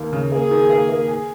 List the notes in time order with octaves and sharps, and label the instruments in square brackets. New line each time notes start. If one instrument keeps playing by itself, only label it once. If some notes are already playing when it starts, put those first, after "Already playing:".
Already playing: [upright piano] D#2 A#3
C#3
[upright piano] A#3 [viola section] G#4
[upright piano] D#3
A#3
A#3
G#4